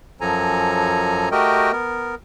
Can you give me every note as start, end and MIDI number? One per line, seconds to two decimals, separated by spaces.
0.21 1.29 42
0.21 1.29 53
0.21 1.29 54
0.21 1.29 69
0.21 1.29 80
0.21 1.29 82
1.32 1.72 57
1.32 1.72 66
1.32 1.72 67
1.32 1.72 70
1.32 1.72 75
1.32 1.72 79
1.72 2.15 59
1.72 2.15 70